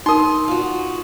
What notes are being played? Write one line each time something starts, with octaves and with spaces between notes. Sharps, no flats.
D#4 A#4 C6 D#6
F4 F#4